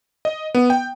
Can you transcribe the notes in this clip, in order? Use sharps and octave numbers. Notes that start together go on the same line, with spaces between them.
D#5
B3
G5